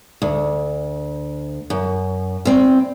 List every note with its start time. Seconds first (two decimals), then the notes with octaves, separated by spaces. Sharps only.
0.22 D2
1.70 F#2
2.45 E2 C4